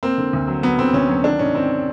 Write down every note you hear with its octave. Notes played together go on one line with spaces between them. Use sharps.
A#3 C4
D3
D2
F#3
F#3 B3
D3 C4
D2 C#4
F#3
D#3 D4
G#2 C#4
D#3 C4